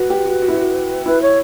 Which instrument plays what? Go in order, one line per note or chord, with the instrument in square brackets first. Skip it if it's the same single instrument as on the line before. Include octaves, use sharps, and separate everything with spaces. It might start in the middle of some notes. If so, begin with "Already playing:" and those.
Already playing: [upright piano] F#4 [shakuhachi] B4
[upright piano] G4
F#4
F#4
E4
F#4
[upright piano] E4 [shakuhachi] B4
[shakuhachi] C#5